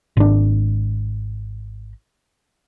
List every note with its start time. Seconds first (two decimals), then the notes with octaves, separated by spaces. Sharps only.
0.17 G#1 D4